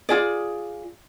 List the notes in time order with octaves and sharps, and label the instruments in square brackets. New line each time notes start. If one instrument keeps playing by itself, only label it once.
[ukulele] F4 G#4 D5